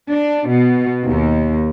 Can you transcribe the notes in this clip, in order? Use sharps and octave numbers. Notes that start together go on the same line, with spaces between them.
D4
B2
D#2